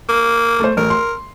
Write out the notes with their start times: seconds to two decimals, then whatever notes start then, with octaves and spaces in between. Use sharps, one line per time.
0.09 A#3
0.60 A3 C5
0.77 A1 A#4
0.90 C6